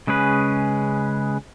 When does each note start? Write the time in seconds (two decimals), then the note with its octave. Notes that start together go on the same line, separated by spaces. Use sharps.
0.07 C#3 G#3 C#4 G#4 B4